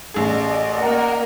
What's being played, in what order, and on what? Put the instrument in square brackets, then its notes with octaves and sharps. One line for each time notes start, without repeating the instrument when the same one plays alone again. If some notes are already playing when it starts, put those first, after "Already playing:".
[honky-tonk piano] A1 G#4 [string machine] D5 D#5
[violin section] A#3 A#4 [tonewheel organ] F#5